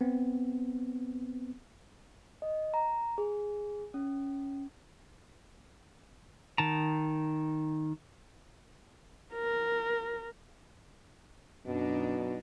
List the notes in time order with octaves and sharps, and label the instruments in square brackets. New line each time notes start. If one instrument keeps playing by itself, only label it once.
[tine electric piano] B3 C4
[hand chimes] D#5
A#5
G#4
C#4
[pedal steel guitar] D#3 A5 A#5
[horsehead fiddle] A#4
[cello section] F#2 D4 D#4 [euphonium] B2